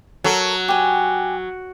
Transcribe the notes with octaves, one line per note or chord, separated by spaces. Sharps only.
F#3 A4 A#4
G4 G#5